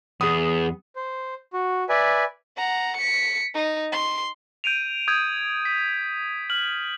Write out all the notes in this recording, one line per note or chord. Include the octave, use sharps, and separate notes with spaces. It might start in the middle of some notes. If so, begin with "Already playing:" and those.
E2 B3 G#4 D#6
C5
F#4
B4 D5 E5 G#5
F#5 A#5
B6 C#7
D#4
C6
G6 D7 D#7 F7
D#6 G6 G#6
B6
F6 F#7